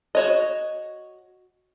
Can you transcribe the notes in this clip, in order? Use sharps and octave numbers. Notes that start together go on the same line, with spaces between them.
F#4 C#5 D#5